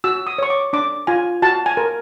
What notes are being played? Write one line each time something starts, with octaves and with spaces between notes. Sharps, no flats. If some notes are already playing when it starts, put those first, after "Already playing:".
F#4 E6
D#6
C#5 C#6
D6
D4 D6
F4 G#5
F#4 A5
G#5
A#4